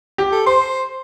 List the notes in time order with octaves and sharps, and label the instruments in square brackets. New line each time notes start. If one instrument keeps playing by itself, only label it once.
[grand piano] G4
[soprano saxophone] A4
[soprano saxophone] C5 [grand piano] C6